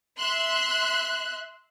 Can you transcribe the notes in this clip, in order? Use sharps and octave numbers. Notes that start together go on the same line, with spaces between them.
E5 C6 F#6